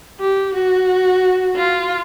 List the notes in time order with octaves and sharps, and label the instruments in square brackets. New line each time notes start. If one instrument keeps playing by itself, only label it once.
[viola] G4
F#4
F4